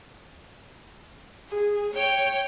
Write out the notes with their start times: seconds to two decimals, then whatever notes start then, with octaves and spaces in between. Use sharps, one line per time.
1.48 G#4
1.94 C#5 G5